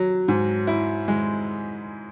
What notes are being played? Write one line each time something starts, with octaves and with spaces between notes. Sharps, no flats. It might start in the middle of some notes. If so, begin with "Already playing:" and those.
Already playing: F#3
G#2
E4
G#3